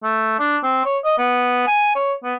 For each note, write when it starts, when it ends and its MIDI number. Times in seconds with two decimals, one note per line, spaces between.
0.03 0.36 57
0.39 0.57 62
0.63 0.81 60
0.85 0.98 73
1.04 1.14 75
1.18 1.63 59
1.67 1.93 80
1.95 2.13 73
2.24 2.35 59